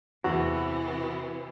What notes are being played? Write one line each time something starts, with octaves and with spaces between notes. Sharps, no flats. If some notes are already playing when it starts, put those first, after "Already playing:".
E2 C3 E3 B3 F#4